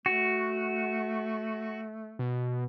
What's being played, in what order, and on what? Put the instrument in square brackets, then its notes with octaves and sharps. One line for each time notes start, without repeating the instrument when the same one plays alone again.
[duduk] A3 [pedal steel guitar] F#4
[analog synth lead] B2